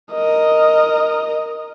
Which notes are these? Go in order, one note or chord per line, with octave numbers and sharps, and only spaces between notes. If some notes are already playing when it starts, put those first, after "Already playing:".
A#4 D#5